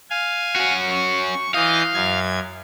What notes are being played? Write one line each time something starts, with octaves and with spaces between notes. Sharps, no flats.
F5 G#5
C#4 F#4
C#6
E3 D#5 F5 G6
F#2 G#6